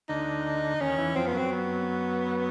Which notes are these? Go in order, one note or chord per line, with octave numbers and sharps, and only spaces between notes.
D2 D3 D#4
D#2 D#3 C#4
E2 E3
F2 F3 C4
B3
F#2 F#3 C4
B3